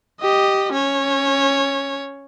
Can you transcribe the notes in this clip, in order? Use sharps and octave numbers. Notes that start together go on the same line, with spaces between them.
G4 D#5
C#4 C#5